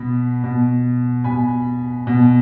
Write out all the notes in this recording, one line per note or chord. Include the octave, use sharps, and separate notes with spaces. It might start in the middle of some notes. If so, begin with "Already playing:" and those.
Already playing: B2 B5
B2
B2 G#5 B5
B2